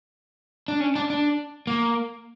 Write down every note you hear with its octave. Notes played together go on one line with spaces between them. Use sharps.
D4
C#4
D4
D4
A#3